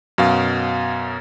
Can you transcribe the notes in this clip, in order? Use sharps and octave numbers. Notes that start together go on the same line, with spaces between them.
F#2 B2 F5